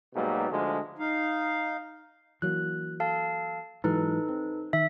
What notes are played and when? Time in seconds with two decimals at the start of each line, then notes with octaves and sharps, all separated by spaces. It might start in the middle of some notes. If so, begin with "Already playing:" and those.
0.14 G#2 B2 F#3 G3 A#3
0.50 D2 D3 F3 G#3
0.99 D#4 F5
2.42 E3 F#3 A#3 F#6
3.00 A4 F5 A5
3.84 G#2 E3 F#3 D#4 A4 B4
4.29 C4
4.73 D#3 E5